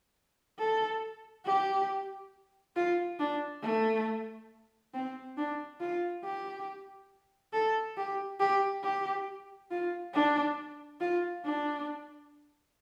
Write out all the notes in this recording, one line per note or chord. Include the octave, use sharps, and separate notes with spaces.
A4
G4
F4
D4
A3
C4
D4
F4
G4
A4
G4
G4
G4
F4
D4
F4
D4